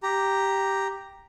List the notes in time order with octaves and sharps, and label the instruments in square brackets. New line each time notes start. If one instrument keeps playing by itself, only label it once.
[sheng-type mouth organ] G4 A#5